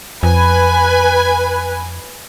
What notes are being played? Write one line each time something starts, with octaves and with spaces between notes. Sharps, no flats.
F2 B4 G#5